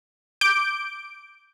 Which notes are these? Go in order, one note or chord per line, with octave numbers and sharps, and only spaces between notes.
D6 G6 D7